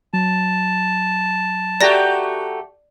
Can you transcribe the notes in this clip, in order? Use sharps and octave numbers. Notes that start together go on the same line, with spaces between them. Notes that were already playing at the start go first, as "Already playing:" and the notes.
F#3 A5
A3 F#4 G4 D5 A#5 A#6